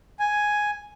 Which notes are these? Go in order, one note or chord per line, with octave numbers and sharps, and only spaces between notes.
G#5